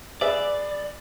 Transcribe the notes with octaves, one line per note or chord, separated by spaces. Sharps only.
G#4 B4 D5 E5